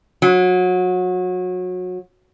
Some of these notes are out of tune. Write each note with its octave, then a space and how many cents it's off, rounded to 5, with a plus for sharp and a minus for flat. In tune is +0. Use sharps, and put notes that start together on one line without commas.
F#3 -25